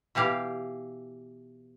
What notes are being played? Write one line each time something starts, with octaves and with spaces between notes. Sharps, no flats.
B2 E3 G4 F5